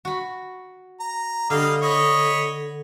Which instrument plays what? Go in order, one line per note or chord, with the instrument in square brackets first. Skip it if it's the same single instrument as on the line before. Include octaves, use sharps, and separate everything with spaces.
[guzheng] F#4 B5
[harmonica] A#5
[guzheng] D3 [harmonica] G3 D#5 F5
[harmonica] C#5 D#5 B5